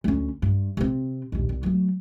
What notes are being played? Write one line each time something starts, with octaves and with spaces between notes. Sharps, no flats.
D2 C#4
G2
C3 C4
A#1 D#2
C2
F#3 A3